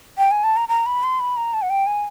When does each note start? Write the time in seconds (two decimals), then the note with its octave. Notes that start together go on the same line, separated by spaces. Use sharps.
0.18 G5
0.31 G#5
0.44 A5
0.57 A#5
0.69 A#5
0.86 B5
1.03 C6
1.20 B5
1.37 A#5
1.54 A5
1.62 F#5
1.70 G5
1.87 G#5